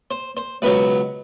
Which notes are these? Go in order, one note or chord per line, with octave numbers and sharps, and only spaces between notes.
C5
C5
C#2 B2 F#3 B4